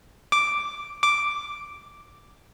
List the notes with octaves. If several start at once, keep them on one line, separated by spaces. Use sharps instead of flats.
D6
D6